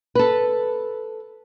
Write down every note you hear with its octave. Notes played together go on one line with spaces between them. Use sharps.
A4 B4